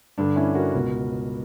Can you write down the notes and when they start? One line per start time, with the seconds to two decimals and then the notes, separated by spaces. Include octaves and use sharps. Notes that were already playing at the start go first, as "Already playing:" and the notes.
0.18 G2 D3 D4
0.36 C#4 E4
0.55 F#4 A#4
0.74 C#2 B2